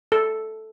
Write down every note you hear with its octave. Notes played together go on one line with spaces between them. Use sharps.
A4